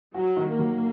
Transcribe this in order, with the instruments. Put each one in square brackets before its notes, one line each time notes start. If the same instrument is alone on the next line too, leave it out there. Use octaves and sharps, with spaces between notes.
[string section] F#3 [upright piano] F#4
[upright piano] D#3
[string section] A#3
[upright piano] F#3